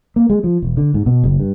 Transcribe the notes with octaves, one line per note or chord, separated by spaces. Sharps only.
A#3
G#3
F3
E1
D3
G#2
B2
F#1
G2